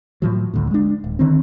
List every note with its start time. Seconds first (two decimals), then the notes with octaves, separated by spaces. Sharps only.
0.22 A2 F3 F#3
0.54 G1 D2 A2
0.71 G#3 D4
1.04 D1
1.19 D3 D#3 C4